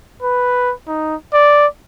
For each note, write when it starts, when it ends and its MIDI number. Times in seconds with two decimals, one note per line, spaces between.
0.22 0.73 71
0.87 1.15 63
1.33 1.67 74